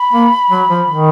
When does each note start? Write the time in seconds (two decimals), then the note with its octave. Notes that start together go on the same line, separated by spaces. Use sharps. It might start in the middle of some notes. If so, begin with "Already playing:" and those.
Already playing: B5
0.13 A#3
0.50 F#3
0.69 F3
0.88 D#3